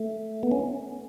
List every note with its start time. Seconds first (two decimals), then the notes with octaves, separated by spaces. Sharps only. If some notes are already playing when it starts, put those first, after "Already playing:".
Already playing: A3
0.43 B3
0.52 C#4